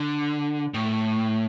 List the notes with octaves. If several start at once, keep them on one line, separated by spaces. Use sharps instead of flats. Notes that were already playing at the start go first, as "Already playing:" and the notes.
Already playing: D3
A2